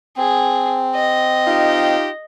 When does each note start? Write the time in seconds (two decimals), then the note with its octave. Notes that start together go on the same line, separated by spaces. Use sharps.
0.17 C4 G#4
0.96 D#5
1.47 D#4 F4 G4